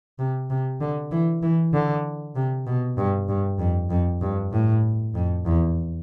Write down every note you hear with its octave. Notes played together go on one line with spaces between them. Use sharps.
C3
C3
D3
E3
E3
D3
C3
B2
G2
G2
F2
F2
G2
A2
F2
E2